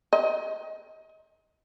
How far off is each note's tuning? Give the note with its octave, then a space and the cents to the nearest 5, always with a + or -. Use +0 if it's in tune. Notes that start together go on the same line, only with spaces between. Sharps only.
D#5 +30